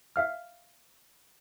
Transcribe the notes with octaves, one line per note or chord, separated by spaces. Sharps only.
E5 F5 F6